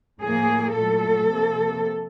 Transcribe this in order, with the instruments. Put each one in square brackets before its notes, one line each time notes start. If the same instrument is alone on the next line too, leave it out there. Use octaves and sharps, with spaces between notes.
[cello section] A2 F3 A#3 G#4
A#2 F#3 A3 A4
C3 F3 A#3